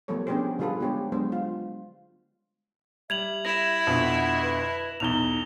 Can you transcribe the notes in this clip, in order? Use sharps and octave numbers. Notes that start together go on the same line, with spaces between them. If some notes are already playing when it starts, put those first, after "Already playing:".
F3 G3 A3 B3 A4 C#5
B3 C#4 D4 G4 G#4 C5
D3 G3 F4 G#4 A4 B4
G#3 B3 D4 G4 C5 C#5
F#3 G#3 B3 D4 C5
F4
G3 E5 G#6 F7 F#7
E4 A#6 E7
F2 B2 D3 F#5
B4
B1 E2 D#4 F7 G7